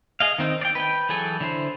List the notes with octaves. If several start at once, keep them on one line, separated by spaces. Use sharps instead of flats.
G#4 D#5 F5
D#3 C4 D#4
D5 G5
B4 G5
E3 F#3 G#4 A4 G#5
D3 E4 C5